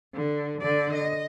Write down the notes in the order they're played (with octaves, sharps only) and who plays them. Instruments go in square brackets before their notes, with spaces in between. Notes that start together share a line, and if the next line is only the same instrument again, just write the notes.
[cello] D3
D3 D5
D#5